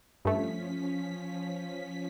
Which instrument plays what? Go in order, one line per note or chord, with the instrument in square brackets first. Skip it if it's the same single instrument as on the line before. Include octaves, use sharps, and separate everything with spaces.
[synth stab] G2 A3 [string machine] F3 C#4 B6